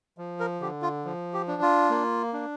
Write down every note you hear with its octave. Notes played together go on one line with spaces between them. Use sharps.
F3
A#4
D3 G4
F4
F3
G4
D4
F4
A#3
D4